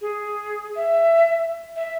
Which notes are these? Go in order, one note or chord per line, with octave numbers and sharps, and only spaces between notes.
G#4
E5
E5